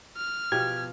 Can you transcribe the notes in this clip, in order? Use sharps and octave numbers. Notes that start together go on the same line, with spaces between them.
F6
B2 F3 G4 G#6